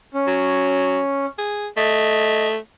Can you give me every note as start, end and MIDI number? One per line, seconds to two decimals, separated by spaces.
0.14 1.26 61
0.27 0.99 54
1.38 1.68 68
1.77 2.57 57
1.77 2.47 75